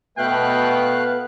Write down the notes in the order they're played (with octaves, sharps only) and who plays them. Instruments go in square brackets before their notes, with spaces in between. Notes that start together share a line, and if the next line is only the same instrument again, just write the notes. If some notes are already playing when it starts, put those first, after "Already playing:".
[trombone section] B2 [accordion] A3 F5 F#6 [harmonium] B3 B4 [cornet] G5